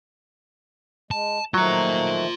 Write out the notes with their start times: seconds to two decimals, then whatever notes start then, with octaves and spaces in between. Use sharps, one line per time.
1.11 G#3 A5
1.54 D#3 F3 F#3 A3 F4 A#5